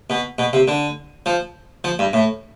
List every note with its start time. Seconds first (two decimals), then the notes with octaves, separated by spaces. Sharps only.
0.10 B2
0.38 B2
0.53 C3
0.68 D3
1.26 F3
1.84 F3
1.99 G2
2.13 A2